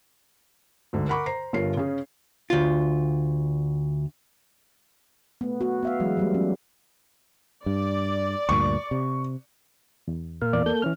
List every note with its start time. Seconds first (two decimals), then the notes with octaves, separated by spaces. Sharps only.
0.93 D2 G#2 D3
1.09 A#4 F#5 A#5 B5 C#6 D6
1.26 C5 A#5 C7
1.53 G1 G2 F4 A#4 C#5 C7
1.77 C#3 C#4 G#4
2.50 D2 F4
5.41 A3 B3
5.61 B3 F#4
5.83 B3 E5 F5
6.00 E3 F#3 G#3
6.17 F#3 G3 A3
6.34 F#3 B3 C#4
7.66 G2 D5
8.49 D2 G2 A#2 C#6
8.91 C3
10.08 E2
10.42 A#2 A#4 F5
10.53 E2 D5
10.66 A#3 A4 G6
10.82 E3 C#4 F6